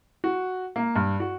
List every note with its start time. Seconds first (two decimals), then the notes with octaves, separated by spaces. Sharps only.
0.24 F#4
0.76 A#3
0.95 G2
1.20 F#4